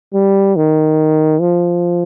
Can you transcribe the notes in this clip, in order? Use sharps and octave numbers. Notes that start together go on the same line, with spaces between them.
G3
D#3
F3